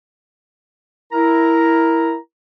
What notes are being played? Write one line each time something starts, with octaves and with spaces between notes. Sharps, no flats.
E4 A#4 A#5